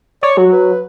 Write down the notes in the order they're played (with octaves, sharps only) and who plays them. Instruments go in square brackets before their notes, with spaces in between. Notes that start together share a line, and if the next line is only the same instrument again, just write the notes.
[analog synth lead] C#5 [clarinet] D5
[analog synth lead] F#3 [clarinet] F#4
[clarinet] B4